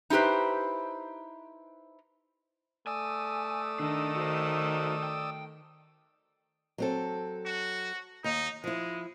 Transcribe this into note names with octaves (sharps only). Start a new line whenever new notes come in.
D#4 E4 G4 B4 C5
A3 D5 G#5 D#6 E6
D#3 D4
F#4 C5
G5
F#3 C4 A4
F#4
D#2 D#4
F3 G#3 E4